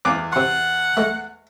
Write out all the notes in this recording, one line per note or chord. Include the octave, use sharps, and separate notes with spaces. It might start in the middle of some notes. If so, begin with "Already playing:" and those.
E2 D6 F#6
C3 F#5 C6
G#3 A3